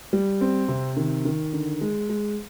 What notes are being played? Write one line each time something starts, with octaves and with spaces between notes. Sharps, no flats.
G3
C4
C3
D#3
D#3
D3
G#3
G#3